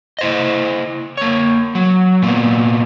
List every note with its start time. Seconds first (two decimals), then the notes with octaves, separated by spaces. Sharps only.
0.19 E4 C5 D#5
1.17 A#3 C#5
1.75 F#3
2.22 A#2 A#3 B3